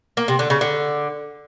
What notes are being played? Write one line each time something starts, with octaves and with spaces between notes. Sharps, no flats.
A#3
C3
D3
C#3
D3